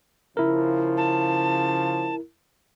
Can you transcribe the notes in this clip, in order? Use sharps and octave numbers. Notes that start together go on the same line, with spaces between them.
C#3 F3 E4 A#4
A5